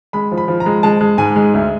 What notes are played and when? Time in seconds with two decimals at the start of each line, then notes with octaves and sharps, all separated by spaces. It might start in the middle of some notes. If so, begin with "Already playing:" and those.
0.13 G#3 B5
0.31 F3
0.37 B5
0.48 F3
0.60 A#5
0.66 G#3
0.83 G#3 A5
1.01 G#3
1.18 G#2 G#5
1.36 G#3
1.54 D2